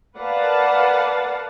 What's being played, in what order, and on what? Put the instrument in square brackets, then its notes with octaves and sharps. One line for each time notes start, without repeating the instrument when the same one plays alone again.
[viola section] A#4 B4 D5 F5 F#5 A5